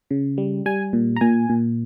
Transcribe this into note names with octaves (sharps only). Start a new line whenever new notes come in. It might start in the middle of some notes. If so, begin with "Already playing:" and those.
C#3
G3
G3 G#5
A#2
A#5
A#2 G#5
A#2